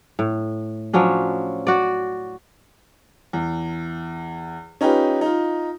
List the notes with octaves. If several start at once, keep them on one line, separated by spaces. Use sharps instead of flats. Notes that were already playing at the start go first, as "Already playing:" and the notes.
A2
F3 F#3 C#4 D4
F#4 D5
E2
C#4 D#4 F4 G4 B4
D#4 F4